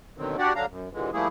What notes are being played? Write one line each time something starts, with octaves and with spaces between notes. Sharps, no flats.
B2 D3 D#3 F#3 C4
D4 F#4 G4 D5 F#5
D3 F#3 D4 F5 A#5
F#2
D#2 A#2 D3 E3 G#3
F3 G3 A3 A#3 E4 G#4